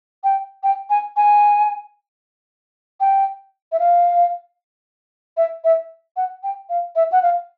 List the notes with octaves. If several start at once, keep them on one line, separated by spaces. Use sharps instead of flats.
G5
G5
G#5
G#5
G5
E5
F5
E5
E5
F#5
G5
F5
E5
F#5
F5